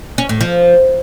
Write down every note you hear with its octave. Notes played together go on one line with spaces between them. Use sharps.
C#4
A2
F3